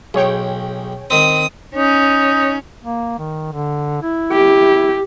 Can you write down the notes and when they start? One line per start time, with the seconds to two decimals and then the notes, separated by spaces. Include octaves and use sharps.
0.14 B1 G#4 C#5 G5
1.10 D#3 C4 D#6
1.75 C#4 D#4
2.83 A#3
3.18 D#3
3.53 D3
4.02 E4
4.32 G4